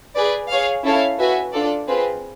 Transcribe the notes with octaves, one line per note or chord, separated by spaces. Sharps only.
G#4 B4 D5
G#4 C#5 F5
C#4 E4 A4 C#5 F5
F#4 B4 E5 G#5
D4 F4 A4 D5
C4 F4 G#4 B4